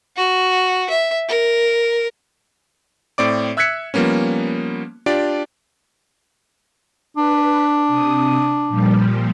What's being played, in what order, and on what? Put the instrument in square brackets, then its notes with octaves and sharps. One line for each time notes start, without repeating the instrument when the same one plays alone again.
[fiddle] F#4
E5
A#4
[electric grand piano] A2 C4 D5 D6
E5 E6 F#6 G#6 B6 C#7
F3 G3 A#3 B3 C#4
D4 F4 G4 D5
[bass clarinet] D4 [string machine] B4
[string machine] C3 D#6
A#2 F3 G3